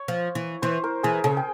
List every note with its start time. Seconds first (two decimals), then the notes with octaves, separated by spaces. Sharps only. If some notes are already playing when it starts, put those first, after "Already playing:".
Already playing: C#5
0.08 F3
0.35 E3
0.62 E3 C5
0.84 A#4
1.03 E3 G#4
1.24 C#3 G#4
1.37 G5